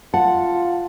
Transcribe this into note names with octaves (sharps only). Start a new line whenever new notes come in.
F4 F#5 A5